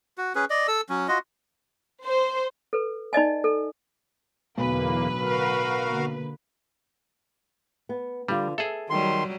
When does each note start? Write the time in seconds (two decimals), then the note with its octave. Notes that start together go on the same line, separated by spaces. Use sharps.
0.18 F#4
0.35 C#4 G#4 B4
0.50 D5 D#5
0.68 A4 E6
0.89 F#3 C#4
1.08 F4 F#4 D#5
2.05 C5
2.73 A4 B4
3.13 D#4 D5 D#5 G#5
3.44 A4
4.57 B1 E2 A2 D3 F#3 A#3 B4
5.20 F#4 A#4 F5
5.88 D3 A#3
7.89 B3
8.28 D3 G3 F4
8.58 G#4 A4 E5
8.90 D#3 F#3 G3 C6